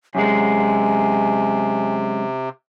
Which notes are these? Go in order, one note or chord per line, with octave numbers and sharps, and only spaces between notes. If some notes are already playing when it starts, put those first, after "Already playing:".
F#2 C3 G#3 G#5